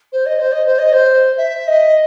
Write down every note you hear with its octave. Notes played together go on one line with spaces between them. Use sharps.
C5
D#5
C5
D#5
C5
D#5
C5
E5
D#5